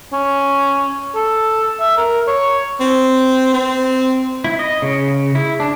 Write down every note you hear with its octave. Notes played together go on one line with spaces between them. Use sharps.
C#4
A4
E5
A#4
C#5
C4
C4
E4
D#5
C#3
E4
D4